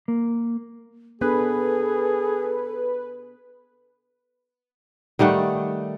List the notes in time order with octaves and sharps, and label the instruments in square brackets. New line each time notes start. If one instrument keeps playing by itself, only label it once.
[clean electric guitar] A#3
[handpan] B3 D4 [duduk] G#4 [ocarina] A4 [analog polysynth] B4
[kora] D#3 G3 A3 F#5